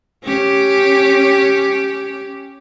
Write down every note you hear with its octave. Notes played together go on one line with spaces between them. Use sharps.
C#4 G4